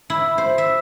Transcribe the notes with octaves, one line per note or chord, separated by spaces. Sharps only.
E4
C5
E5